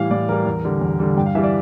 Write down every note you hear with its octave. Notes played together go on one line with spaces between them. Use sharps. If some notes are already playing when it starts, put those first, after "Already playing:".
Already playing: A2 E3 G3 F5
A2 D5
E3 G3 A#4
E2
D3 G3
E2
D3 G3
G2 G5
F5
E3 G3 E5
D5